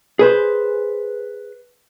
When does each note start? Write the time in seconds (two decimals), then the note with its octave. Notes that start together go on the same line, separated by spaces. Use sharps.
0.19 G#4 B4 C5